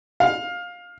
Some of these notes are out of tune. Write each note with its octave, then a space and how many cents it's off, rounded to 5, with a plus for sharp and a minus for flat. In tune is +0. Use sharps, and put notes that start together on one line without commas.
F5 +20